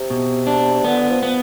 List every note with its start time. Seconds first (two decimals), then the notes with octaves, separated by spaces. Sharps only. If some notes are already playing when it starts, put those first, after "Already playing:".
Already playing: C3
0.10 B2
0.47 D4
0.84 D3 B3
1.10 F3
1.23 B3